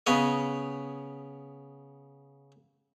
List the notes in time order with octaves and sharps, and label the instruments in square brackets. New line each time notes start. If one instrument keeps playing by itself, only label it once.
[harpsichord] C#3 B3 C#5 D#5